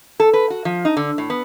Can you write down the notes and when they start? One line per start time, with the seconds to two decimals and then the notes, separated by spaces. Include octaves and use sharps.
0.20 A4
0.33 B4
0.50 F#4
0.65 F3
0.85 D#4
0.97 D3
1.18 A2
1.30 B3